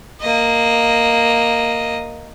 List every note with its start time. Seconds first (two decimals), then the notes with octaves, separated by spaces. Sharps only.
0.21 A#3 D#5